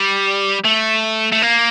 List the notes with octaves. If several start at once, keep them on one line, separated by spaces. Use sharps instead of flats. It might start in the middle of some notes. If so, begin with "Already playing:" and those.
Already playing: G3
A3
A3
A#3